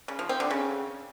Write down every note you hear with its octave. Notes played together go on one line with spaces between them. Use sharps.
C#3
F3
C4
D3
C#3